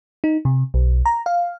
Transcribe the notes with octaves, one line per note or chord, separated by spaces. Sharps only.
D#4
C3
B1
A#5
F5